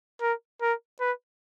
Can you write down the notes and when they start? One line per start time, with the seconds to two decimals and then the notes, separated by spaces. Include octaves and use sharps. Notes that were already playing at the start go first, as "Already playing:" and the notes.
0.21 A#4
0.61 A#4
1.00 B4